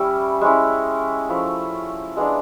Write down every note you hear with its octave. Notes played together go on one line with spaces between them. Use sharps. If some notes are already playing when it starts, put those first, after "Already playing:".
Already playing: G3 C#4 E4
G#3 C#4 E4
F3 A3 C#4 E4
G#3 B3 D4